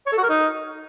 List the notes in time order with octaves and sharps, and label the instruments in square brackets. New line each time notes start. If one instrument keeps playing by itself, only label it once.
[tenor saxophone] C#5
A4
F#4
A#4
D#4